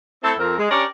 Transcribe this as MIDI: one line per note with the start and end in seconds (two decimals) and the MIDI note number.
0.24 0.34 57
0.24 0.34 60
0.24 0.34 64
0.24 0.34 69
0.39 0.56 41
0.39 0.56 60
0.39 0.56 70
0.58 0.71 56
0.71 0.84 61
0.71 0.84 62
0.71 0.84 67
0.71 0.84 70
0.71 0.84 73
0.71 0.84 74